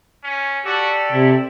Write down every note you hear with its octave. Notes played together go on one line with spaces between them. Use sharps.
C#4
F#4 G4 A4 D5
C3 E4